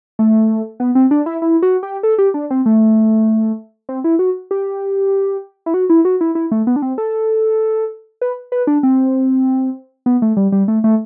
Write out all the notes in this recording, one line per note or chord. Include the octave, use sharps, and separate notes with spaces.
A3
B3
C4
D4
E4
E4
F#4
G4
A4
G4
D4
C4
A3
C4
E4
F#4
G4
E4
F#4
E4
F#4
E4
E4
A3
B3
D4
C4
A4
B4
B4
D4
C4
B3
A3
G3
G3
A3
A3